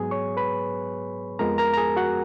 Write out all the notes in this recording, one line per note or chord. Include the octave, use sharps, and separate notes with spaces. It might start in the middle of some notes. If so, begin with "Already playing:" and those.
Already playing: G#2 F#3 B3 G#4 G#5
C#5 C#6
B4 B5
F2 F3 G#3 B3 A#4 A#5
A#4 A#5
A#5
G#4 G#5
F#4 F#5